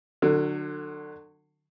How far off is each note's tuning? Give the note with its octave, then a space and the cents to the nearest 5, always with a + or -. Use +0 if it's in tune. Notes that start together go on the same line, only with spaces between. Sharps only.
D3 +30 F#3 -10